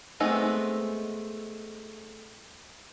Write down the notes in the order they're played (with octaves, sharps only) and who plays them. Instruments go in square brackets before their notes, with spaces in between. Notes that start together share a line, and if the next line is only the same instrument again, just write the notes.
[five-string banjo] G#3 A3 B3 C4 D#4